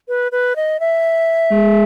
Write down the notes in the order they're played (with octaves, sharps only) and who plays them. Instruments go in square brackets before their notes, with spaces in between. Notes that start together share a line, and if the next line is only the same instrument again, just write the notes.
[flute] B4
B4
D#5
E5
[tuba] G#3